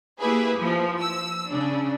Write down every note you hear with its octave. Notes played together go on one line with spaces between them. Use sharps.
A#3 E4 G4 G#4 B4
F3
E6
C#3 D4